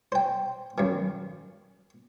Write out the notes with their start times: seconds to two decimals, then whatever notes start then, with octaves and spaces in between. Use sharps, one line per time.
0.12 C5 G5
0.78 F#2 D#3